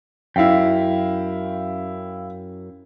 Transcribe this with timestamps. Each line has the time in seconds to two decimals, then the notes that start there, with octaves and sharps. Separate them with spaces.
0.36 F#2 E4 F5 G5